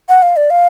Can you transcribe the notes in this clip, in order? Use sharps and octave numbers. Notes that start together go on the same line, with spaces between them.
F#5
F5
D5
F5